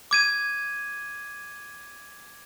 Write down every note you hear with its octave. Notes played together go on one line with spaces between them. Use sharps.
D6 G#6 D#7